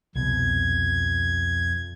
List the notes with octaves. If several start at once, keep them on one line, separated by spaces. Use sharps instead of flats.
C2 F2 B2 G#6